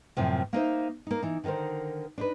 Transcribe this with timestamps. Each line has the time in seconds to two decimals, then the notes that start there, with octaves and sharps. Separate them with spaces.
0.17 F#2 A2 C3 F3
0.53 A#3 D#4 C5 E5
1.07 A#3 D#4
1.23 E3 D#4
1.44 D3 D#3 D#4 A#4 C5
2.18 D4 D#4 B4